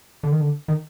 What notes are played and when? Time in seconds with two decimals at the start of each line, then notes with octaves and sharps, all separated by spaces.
0.23 D3
0.32 D#3
0.41 D3
0.68 D#3